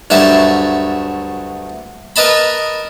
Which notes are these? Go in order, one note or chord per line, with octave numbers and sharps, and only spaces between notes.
D2 G2 F#3 E5 A5
A#4 B4 D#5 A5 B5